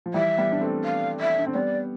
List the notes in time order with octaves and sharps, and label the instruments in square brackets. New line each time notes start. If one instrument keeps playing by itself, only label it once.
[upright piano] F3
[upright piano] E3 G3 [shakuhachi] E5
[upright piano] G3 B3
D4
A3 C4
[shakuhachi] F5
E5
[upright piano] D4
C4
[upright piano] G3 B3 [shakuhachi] D5